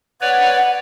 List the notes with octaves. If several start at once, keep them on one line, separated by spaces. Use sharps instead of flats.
B4 C#5 D5 F#5